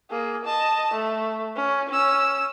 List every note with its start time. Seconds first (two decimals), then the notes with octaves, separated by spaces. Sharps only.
0.10 A#3 G#4
0.45 D#5 A5
0.94 A3
1.56 C#4
1.89 C#4 E6